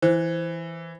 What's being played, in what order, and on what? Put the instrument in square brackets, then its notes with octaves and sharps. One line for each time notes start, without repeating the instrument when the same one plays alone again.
[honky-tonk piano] E3 [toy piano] C5